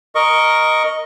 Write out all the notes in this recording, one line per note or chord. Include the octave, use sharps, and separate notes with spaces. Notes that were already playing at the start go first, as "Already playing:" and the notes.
A#4 D#5 C#6